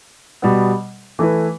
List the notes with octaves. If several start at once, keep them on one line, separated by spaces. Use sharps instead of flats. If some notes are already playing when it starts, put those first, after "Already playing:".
B2 G3 B3
E3 A3 E4 B4